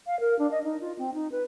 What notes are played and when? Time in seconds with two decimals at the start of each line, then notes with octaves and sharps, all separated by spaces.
0.07 F5
0.20 A#4
0.39 D4
0.51 D#5
0.64 D#4
0.81 F4
0.99 C4
1.14 D#4
1.32 B4